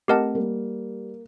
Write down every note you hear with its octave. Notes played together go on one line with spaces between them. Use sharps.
A3 C4 G4 A#4 D#5 F#5 A5
G3 A#3